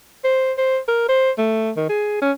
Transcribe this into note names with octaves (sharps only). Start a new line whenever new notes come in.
C5
C5
A#4
C5
A3
D#3
G#4
C#4